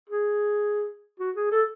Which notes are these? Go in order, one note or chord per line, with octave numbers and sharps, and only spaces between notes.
G#4
F#4
G#4
A4